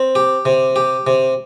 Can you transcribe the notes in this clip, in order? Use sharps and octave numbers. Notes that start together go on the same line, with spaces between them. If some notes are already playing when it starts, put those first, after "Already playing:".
Already playing: C4
G4
C3
G4
C3